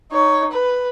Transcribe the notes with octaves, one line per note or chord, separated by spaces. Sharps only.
D#4 C#5
B4